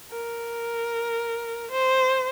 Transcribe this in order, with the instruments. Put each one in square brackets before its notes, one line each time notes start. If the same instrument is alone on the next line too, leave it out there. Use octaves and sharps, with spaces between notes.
[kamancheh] A#4
C5